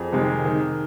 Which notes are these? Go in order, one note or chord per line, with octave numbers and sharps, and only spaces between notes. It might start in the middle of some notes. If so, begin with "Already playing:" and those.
Already playing: F2 G#4
C3 D#3 G#3
D#3